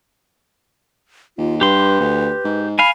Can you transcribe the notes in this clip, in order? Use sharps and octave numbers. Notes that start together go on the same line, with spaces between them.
D#2 F4
G2 G4 B4 C6
D2
G#2
F5 G#5 B5